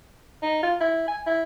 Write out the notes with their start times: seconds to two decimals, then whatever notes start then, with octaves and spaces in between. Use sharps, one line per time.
0.42 D#4
0.63 F4
0.80 E4
1.08 G#5
1.26 E4